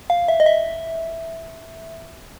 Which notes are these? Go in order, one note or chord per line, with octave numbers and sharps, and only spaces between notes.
F5
E5
D#5
E5